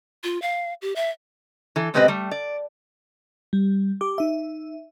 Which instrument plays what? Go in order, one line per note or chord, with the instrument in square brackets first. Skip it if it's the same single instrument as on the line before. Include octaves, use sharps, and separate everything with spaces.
[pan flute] F4
F5
G4
E5
[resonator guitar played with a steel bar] E3 A4
B2 G#3 C4 G4 B4 D#5
G3 A3
D5
[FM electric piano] G3
G4 D6
D#4 E5